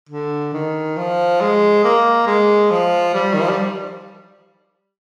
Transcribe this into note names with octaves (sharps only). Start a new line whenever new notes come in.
D3
D#3
F3
G#3
A#3
G#3
F3
G3
D#3
F3
G3